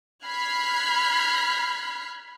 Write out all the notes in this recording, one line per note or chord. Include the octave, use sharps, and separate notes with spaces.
B5 F6 F#6 G#6 B6 C7